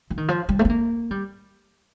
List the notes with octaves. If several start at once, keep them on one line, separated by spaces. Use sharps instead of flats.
F3
D#3
F3
G3
A3
C4
A#3
G3